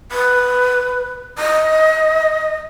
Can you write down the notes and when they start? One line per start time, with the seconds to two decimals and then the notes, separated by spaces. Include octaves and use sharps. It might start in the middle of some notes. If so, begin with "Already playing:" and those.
0.11 B4
1.38 D#5